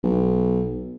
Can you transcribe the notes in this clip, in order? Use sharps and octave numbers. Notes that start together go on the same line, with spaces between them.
B1